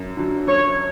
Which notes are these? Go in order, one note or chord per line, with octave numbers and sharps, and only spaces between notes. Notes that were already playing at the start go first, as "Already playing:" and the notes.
Already playing: F#2
D3 F#3
F#2 C#5